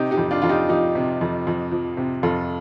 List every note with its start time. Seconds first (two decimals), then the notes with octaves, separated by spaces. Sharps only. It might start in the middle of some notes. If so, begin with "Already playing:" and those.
Already playing: C3 D#4 G4
0.11 D#4 G4
0.18 F2
0.31 D4 F4
0.42 F2 F4
0.49 D#4 G4
0.69 F3 D#4 G4
0.95 C3
1.21 F2
1.47 F2
1.72 F3
1.97 C3
2.23 F2 F4 A4